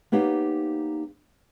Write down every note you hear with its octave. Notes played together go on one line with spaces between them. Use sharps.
A#3 B3 D#4 G4 C#5 F5